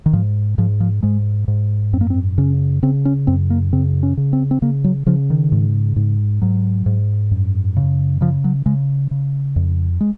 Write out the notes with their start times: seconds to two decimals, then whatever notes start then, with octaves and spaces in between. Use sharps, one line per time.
0.06 D#3
0.13 G#2 F3
0.58 G#2 F3
0.80 F3
1.03 G#2 G#3
1.48 G#2
1.93 F#2 C4
2.01 A#3
2.10 C4
2.38 C#3 C#4
2.82 C#3 C4
3.05 C#4
3.27 F#2 C4
3.50 A#3
3.73 C#3 C4
4.03 C#4
4.17 C#3
4.33 C4
4.51 C4
4.62 C#3 A#3
4.84 F#3
5.06 C#3 F3
5.30 D#3
5.52 G#2
5.96 G#2
6.42 G#2 F#3
6.86 G#2
7.31 F#2
7.77 C#3
8.21 C#3 F3
8.44 F#3
8.66 C#3 G#3
9.11 C#3
9.56 F2
10.01 G#3